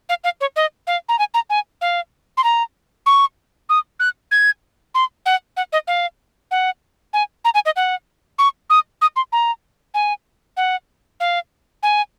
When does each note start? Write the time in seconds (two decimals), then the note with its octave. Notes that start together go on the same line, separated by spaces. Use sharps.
0.09 F5
0.24 F5
0.41 C#5
0.56 D#5
0.87 F5
1.09 A#5
1.19 G#5
1.34 A#5
1.50 G#5
1.81 F5
2.37 C6
2.44 A#5
3.06 C#6
3.69 D#6
4.00 F#6
4.31 G#6
4.95 C6
5.26 F#5
5.57 F#5
5.73 D#5
5.87 F5
6.51 F#5
7.13 G#5
7.45 A#5
7.54 G#5
7.66 D#5
7.76 F#5
8.39 C#6
8.70 D#6
9.02 D#6
9.16 C6
9.32 A#5
9.94 G#5
10.57 F#5
11.20 F5
11.83 G#5